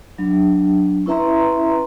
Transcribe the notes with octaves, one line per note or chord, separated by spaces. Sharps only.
F#3 D4
C#4 E4 B4 E5 A#5 C6